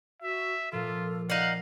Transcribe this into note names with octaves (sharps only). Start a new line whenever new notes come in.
F#4 E5
A#2 F3 F4 A4
D#4 D5 F5 F#5